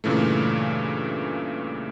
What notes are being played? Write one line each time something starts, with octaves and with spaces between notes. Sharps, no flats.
G2 A#2 C#3 E3 A3